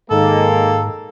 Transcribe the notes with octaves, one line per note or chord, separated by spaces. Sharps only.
G#2 D#3 G#3 A#3 A4